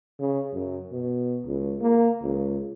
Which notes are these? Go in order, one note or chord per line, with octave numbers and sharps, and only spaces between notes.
C#3
F#2
B2
C#2
A#3
C#2